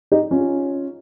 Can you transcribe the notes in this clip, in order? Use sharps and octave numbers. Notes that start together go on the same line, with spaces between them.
D#4 G4
C#4 F4